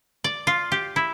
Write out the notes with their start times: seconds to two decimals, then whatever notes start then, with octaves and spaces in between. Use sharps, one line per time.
0.24 D5
0.47 F4
0.72 G4
0.96 E4